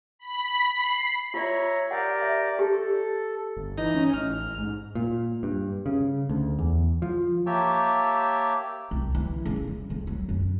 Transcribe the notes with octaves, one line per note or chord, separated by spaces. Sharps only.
B5
C7
F4 C#5 D5 E5 A#5
G4 A#4 D5 F#5
E5
G4 A4
G1
E3 D#4
C#4
A1 F6
G#2
A#2
G2
C#3
D2
E2
F3
A#3 G4 C#5 E5 G5 A5
C2
E3
C#3
G3
F2
F#3
F#2